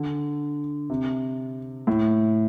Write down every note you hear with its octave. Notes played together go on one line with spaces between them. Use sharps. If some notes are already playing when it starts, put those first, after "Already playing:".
Already playing: D3
C3
A2